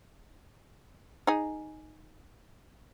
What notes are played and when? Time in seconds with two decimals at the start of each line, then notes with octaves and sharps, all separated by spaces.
1.27 D#4 G#4